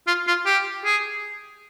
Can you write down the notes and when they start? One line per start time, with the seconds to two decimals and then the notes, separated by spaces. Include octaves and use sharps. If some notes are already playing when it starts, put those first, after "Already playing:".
0.07 F4
0.27 F4
0.46 G4
0.85 G#4